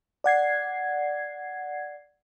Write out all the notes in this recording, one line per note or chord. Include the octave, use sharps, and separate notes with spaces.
D5 F#5 G#6 C7